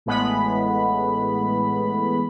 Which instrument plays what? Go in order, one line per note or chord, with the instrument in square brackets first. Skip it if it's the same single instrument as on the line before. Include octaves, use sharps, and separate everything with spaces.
[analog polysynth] A1 A2 G#3 B3 B5